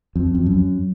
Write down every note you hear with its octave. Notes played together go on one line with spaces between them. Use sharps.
F2
F2
F#2